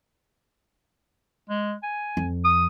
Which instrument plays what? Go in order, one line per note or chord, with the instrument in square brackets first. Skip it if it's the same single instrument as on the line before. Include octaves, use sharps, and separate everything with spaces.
[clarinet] G#3
G#5
[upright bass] F2
[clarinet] D#6